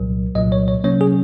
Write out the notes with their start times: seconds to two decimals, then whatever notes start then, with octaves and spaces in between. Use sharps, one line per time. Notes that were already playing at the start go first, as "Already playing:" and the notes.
Already playing: C2 A#2 F#3
0.35 C2 A#2 F#3 D#5
0.52 C#5
0.68 C#5
0.84 C3 F#3 A#3 C#4 C#5
1.01 G#4